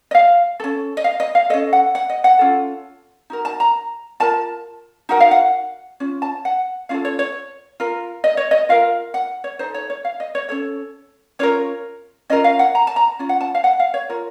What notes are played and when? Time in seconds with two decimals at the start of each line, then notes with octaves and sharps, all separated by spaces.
0.11 D#5
0.15 F5
0.60 C#4 A4
0.97 D#5
1.04 F5
1.20 D#5
1.35 F5
1.50 A4 D#5
1.54 C#4
1.73 F#5
1.95 F#5
2.10 D#5
2.24 F#5
2.39 C#4 F4 A4
3.30 D#4 F#4 A#4
3.45 A5
3.60 A#5
4.20 F4 A#4 A5
5.09 D#4 F#4 A#4 F#5
5.20 F5
5.31 F#5
6.00 C#4 F4
6.22 A5
6.45 F#5
6.89 C#4 F4 A4 F5
7.05 C#5
7.19 C#5
7.80 F4 A#4
8.24 D#5
8.37 C#5
8.51 D#5
8.69 F4 A#4 F5
9.14 F#5
9.44 C#5
9.59 D#4 A4 C5
9.74 C#5
9.90 C#5
10.05 F5
10.20 D#5
10.35 C#5
10.49 C#4 A4 C#5
11.39 C#4 F4 A#4 C#5
12.30 C#4 F4 A#4 D#5
12.44 F5
12.59 F#5
12.75 A#5
12.87 A5
12.96 A#5
13.19 C#4 F4
13.29 F#5
13.41 A5
13.55 F5
13.64 F#5
13.80 F5
13.94 C#5
14.09 F4 A#4